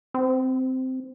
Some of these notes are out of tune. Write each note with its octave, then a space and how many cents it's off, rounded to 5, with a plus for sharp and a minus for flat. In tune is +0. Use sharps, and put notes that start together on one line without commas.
C4 -10